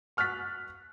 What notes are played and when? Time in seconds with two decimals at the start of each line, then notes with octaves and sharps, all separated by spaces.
0.17 C#6 F6 F#6 A6 B6